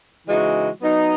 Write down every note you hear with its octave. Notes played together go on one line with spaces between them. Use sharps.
C#3 E3 G#3 D#4 F#4
F#3 B3 D#4